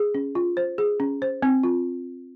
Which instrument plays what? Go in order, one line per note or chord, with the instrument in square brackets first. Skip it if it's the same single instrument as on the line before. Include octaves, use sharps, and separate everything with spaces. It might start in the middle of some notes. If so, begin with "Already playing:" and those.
Already playing: [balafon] G#4
C#4
F4
C5
G#4
C#4
C5
C4
F4